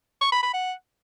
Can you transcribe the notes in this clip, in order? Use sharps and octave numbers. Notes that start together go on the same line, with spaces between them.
C#6
B5
B5
F#5